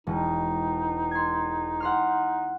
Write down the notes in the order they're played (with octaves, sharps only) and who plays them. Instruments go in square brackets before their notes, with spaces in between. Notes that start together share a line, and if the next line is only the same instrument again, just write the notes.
[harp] E1 [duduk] D#4
[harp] C6 G#6
F#5 C6 F6